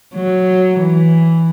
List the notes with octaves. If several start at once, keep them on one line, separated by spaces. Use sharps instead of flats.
F#3
E3